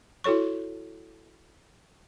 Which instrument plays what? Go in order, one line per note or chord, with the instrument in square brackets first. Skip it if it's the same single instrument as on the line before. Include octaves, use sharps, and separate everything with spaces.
[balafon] E4 F#4 A4 C#5 C#6